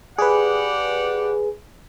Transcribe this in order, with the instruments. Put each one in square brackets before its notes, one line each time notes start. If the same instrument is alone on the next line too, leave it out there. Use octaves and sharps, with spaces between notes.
[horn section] G4 D5 F#5 [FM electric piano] G#4 B4